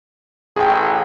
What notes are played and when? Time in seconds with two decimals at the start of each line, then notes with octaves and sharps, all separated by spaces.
0.56 A1 G#4 G5